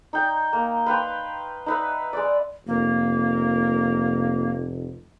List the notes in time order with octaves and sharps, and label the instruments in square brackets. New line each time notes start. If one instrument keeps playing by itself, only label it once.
[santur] D#4 G5
A#3
B4 F5 G5 C6
D#4 B4 E5
G#3 D5
[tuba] F1 [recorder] A#3